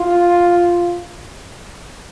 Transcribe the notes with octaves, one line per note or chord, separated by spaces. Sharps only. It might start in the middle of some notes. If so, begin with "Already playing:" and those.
Already playing: F4